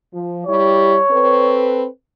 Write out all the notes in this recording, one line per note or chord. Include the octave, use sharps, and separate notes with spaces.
F3
G3 E4 G4 C#5
C4 A4 B4